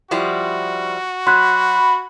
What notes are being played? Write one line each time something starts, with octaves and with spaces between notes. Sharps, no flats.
F3 G3 E4 F#4
F#3 B5 C6 F#6